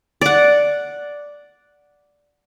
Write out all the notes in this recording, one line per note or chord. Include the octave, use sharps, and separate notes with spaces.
D5 F#5